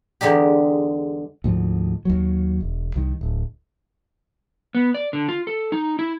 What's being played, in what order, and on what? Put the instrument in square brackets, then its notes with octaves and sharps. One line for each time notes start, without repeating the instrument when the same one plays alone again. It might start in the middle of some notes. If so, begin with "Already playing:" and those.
[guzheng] E2 D3 G#3 D#4 G4
[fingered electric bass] D2 G#2 F3
D#2 F#3
E1
C2 D#3
D1
[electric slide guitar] B3
D5
D3
F4
A4
D#4
E4